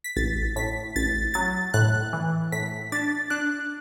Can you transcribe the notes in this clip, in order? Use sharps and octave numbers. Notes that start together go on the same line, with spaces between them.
B6
A1 A6
A2 B6
A1 A6
F#3 A6
A2 F#6
E3
A2 B6
D4 A6
D4 F#6